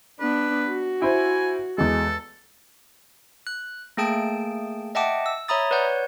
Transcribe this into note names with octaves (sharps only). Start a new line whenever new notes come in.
B3 D4 B4
F#4
E4 C5 G#5
E2 G#3 A4
F#6
A3 A#3 G#4 G5 A5 D7
D#5 E5 F#5 G5 A5 D6
E6
C#5 E5 A#5 B5 D#6 A6
B4 C#5 D5 F#5 G6